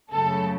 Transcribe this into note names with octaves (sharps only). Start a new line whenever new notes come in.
F#2 C#3 F#3 A3 A4